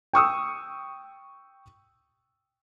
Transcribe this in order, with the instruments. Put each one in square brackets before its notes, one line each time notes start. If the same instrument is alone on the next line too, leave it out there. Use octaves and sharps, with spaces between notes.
[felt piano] G5 C#6 D#6 E6